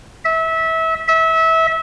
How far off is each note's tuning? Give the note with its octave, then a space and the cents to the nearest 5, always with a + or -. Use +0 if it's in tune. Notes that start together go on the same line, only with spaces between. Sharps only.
E5 -25
E5 -25